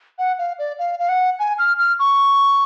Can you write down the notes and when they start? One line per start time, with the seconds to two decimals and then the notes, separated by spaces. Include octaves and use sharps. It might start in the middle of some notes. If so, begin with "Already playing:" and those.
0.19 F#5
0.39 F5
0.59 D5
0.79 F5
1.00 F5
1.09 F#5
1.39 G#5
1.59 F6
1.79 F6
1.99 C#6